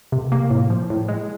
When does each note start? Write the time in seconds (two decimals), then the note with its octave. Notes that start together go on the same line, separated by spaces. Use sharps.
0.12 C3
0.32 A#3
0.50 A2
0.70 F3
0.90 A2
1.08 G#3